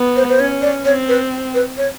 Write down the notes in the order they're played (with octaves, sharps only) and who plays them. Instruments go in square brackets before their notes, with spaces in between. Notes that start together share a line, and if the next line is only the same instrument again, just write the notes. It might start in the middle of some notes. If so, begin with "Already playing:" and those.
Already playing: [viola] B3
[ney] C5
C5
[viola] C#4 [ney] C#5
[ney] D5
[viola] C4 [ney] C#5
[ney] B4
B4
C#5